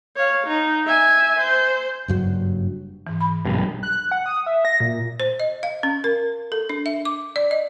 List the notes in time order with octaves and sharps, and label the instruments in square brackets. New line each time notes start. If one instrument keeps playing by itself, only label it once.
[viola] C#5 F5
D#4
E5 G#5
C5
[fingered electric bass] F#1 G2 F#3
[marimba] G#2 E3
B5
[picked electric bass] B1 G2
[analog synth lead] F#6
F#5
D#6
E5
A#6
A#2
[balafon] C5
D#5
F5
C#4
A#4
A4
D4
E5
D6
D5
D#5